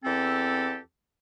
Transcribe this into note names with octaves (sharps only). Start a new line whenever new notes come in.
E2 C4 G4 A4